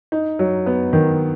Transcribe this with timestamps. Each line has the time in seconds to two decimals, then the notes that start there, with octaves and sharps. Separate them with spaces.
0.12 D#4
0.39 F#3
0.66 B3
0.93 D#3